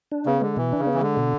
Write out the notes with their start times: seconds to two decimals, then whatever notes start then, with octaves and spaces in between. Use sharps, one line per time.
0.12 D4
0.26 C#3 B3
0.41 D3 G#3
0.57 B2 E3
0.72 D4
0.79 C#3
0.87 B3
0.94 E3
1.02 D3 G#3
1.17 B2